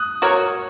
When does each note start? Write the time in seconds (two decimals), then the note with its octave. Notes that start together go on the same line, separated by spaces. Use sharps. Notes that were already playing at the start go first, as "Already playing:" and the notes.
Already playing: D#6 F#6
0.22 F#4 A#4 C#5